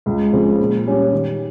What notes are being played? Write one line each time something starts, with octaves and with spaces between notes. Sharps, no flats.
C#2
C#3 F3 C4
A#2
G3 C#4 G4
D#3